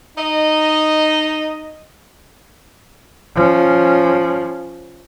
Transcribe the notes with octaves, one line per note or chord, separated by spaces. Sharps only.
D#4 D#5
F3 C#4